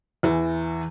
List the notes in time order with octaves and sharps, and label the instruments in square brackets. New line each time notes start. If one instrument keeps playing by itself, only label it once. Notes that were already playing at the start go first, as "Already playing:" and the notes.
[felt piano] E2 E3